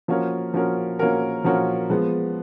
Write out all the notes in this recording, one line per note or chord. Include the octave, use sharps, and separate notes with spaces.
F3 A#3 C#4 F#4 A#4
F3 A#3 C#4 F#4 A#4
F3 A#3 C#4 F#4 A#4
F3 A#3 C#4 F#4 A#4
F3 G#3 B3